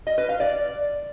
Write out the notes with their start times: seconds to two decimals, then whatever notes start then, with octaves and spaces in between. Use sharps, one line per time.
0.07 D#5
0.18 B4
0.29 F5
0.40 D5